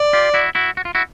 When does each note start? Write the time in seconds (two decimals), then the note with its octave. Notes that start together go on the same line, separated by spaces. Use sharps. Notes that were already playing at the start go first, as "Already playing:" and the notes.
Already playing: D5
0.13 F4 G4
0.34 E4 F#4
0.55 E4 F#4
0.77 F#4
0.85 F4
0.95 E4 F#4